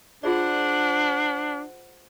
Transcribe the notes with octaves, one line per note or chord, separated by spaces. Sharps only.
D4 F4 G#4 C5 D5 F#5